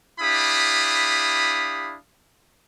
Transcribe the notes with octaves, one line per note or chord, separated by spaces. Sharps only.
D4 E4 G4 F5 B5 D#6